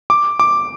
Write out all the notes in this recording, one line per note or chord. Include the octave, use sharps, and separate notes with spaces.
D6
D6